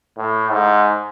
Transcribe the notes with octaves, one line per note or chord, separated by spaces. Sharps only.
A2
G#2